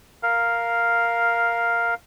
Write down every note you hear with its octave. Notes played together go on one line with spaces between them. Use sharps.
A#4 F5